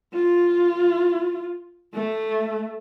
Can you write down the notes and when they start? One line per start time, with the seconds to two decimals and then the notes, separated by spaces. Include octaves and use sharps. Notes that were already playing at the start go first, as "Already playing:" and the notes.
0.14 F4
1.94 A3